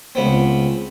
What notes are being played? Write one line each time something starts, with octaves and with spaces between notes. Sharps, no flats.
C#2 B3 C4